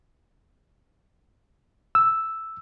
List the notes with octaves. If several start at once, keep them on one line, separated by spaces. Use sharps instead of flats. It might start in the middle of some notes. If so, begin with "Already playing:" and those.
E6